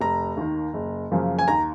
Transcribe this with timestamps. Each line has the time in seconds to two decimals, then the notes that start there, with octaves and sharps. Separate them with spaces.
0.01 F1 A#5
0.37 D#2 D#3
0.74 F#1
1.11 F#2 C#3 F3 A#3
1.39 G#5
1.48 D#2 A#5